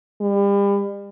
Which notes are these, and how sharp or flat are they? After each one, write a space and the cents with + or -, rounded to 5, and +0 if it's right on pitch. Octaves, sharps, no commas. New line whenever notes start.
G3 +35